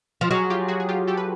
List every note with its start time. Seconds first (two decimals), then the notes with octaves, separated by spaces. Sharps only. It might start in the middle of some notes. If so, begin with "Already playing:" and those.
0.21 F3
0.31 F#3 F#4 G#4
0.50 F4 G4
0.68 F#4 G#4
0.80 G#4
0.89 F4 G4
1.07 G4 A4
1.17 B4